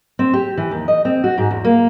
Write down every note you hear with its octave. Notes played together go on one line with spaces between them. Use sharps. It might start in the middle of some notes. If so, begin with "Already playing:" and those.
C4
G4
E3
D#2
D#5
C4
F#4
G#2
E2
A#3